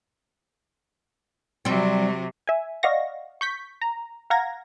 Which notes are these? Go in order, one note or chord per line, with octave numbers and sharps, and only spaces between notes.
C3 F#3 G3 C4
E5 G#5
D5 D#5 F5 F#5 C#6 A#6
C#6 G6 B6
A#5
F5 F#5 A#5 G#6 A#6